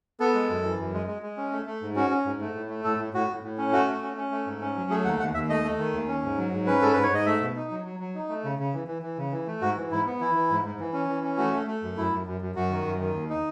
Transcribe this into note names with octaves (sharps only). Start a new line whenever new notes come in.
B3 A4
G#3
F#2
E3
F#2
G#3
G#3
G#3
C#4
A3
A3
G#2
C#4 F#4
C#4
G#2
A3
A2
A3
A2 A4
A2
A2 F#4
A2
A2
C#4
A3 F#4
A3
C#4
C#4
A3
G#2
C#4
F#3
A3 G#4
D#2 F#5
D#2 F#5
D#2 E5
A3 D#5
A3
D#3
D#2
C#4
G#2
F#3
G#2
C#4 B4
G#2 A4
G#2 B4
C#5
G#2 D#5
A3 E5
B2
D#4
F#3
F#3
F#3
D#4
A3
C#3
C#3
E3
E3
E3
C#3
E3
A3
G#2 F#4
E3
G#2 E4
B3
E3 E4
E3
G#2
G#2
E3
C#4
E3
C#4
A3 F#4
A3
A3
F#2
F#2 E4
F#2
F#2
F#2
F#2 F#4
D#3
F#2
D#3
D#2
D#4